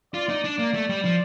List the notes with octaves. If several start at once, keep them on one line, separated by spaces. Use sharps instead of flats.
F4 D5
D#4
D4 D5
A#3
A3
G3
F3